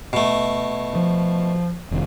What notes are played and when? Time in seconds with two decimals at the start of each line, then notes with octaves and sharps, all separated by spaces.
0.13 B2 A3
0.95 F3
1.91 F1 D#3